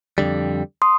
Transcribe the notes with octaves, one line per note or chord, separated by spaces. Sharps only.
F2 D3 G3
C6 D#6